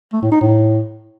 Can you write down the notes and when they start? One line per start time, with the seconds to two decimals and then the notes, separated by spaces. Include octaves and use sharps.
0.13 A3
0.22 A2
0.32 D#4
0.41 A2